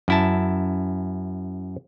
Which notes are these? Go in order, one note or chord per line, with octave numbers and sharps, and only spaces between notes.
F#2 E4 A5